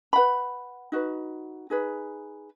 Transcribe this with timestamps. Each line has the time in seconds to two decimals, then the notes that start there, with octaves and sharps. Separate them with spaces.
0.13 B4 F#5 B5
0.92 D#4 F#4 B4
1.70 D#4 G#4 B4